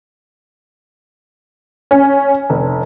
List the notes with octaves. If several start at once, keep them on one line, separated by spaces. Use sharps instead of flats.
C#4
F1